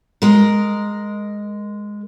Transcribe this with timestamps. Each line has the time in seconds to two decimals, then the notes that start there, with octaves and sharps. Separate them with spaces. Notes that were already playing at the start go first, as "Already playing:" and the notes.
0.22 G#3 A#4